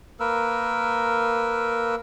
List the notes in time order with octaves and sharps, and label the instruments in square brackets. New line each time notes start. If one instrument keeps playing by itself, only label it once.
[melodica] A#3 A#4 B4 E6